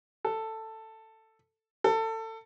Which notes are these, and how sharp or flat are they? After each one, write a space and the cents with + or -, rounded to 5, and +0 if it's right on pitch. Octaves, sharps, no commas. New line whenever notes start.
A4 +10
A4 +25